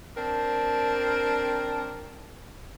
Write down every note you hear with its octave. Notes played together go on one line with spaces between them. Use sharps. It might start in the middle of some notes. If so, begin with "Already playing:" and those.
C4 D4 A#4